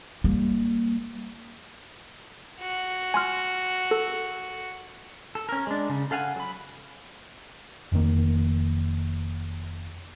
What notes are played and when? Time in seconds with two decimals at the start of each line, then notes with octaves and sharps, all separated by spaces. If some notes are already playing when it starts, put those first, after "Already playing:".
0.24 G3 A#3
2.60 F#4
3.14 G#5 C6 F6
3.91 A4
5.35 A4
5.49 C#4 A#4
5.67 G#3 D4
5.89 C#3
6.11 A4 F5 F#5 G#5
6.36 F#3 B5
7.92 F1 F2 D#3 A#3